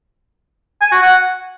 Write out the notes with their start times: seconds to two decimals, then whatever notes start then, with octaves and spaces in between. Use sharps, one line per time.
0.82 G#5
0.92 F#4
1.02 F#5